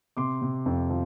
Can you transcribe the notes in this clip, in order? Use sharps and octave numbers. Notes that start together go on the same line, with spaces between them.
C3 C6 D6
C3
F2
F3